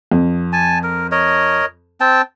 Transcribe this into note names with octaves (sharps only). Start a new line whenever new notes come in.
F2
G#5 A5
A#4
A#4 C#5 D#5
C4 G5 A5